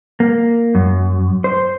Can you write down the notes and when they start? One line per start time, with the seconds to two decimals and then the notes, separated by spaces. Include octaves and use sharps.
0.20 A#3
0.75 F#2
1.44 C5